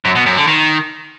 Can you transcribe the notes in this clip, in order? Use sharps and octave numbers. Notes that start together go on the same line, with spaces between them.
F#2
B2
F#2
D3
D#3